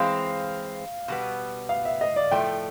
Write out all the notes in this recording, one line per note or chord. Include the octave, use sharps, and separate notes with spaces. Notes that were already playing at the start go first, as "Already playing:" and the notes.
Already playing: E3 G#3 C4 F5
B2 G3 B3
F5
E5
D#5
D5
A2 F3 A3 G5